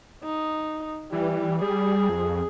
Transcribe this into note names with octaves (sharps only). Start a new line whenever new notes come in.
D#4
E3 G3
G3 G#4
F2